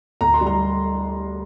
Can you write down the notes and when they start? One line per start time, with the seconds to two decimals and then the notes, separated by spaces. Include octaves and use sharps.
0.21 D2 A#5
0.34 C6
0.41 G3
0.47 A#5